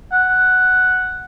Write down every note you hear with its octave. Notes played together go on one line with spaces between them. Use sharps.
F#5